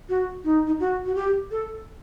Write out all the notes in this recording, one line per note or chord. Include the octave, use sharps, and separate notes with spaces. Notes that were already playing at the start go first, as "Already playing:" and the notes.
F#4
D#4
D#4
F#4
F#4
G4
A4